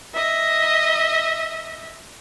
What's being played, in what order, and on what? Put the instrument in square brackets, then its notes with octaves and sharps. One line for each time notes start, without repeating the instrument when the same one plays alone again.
[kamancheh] D#5 E5